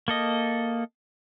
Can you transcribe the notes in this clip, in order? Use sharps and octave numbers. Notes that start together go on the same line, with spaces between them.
A#3 A4 D#5